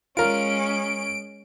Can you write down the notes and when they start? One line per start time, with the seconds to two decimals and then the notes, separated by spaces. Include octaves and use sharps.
0.17 G#3 C#4 F4 A#4 D7